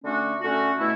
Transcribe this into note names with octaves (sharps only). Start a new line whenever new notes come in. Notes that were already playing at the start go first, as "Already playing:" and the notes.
D3 A3 C#4 F#4
D3 A3 C#4 F#4
B2 A3 E4